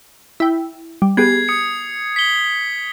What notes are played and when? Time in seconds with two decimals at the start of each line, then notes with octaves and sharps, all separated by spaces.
0.40 E4 G5
1.02 G3
1.17 B3 G4 G#4 G#6 C7
1.48 D#6 C#7
2.16 B6 G7